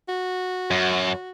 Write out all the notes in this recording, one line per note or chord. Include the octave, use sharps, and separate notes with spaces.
F#4
F#2